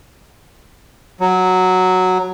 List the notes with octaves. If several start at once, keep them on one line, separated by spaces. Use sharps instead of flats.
F#3